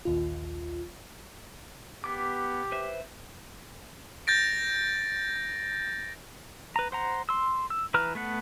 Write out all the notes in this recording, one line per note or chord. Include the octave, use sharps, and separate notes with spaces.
A#1 D#2 F4
B3 G4 D6
B4 C5 E5
G6 A6 A#6 D7
B4 A#5
C5 F#5 A#5
C6 E6
E6
E3 B4 A#5 F6
A3 B3 F#5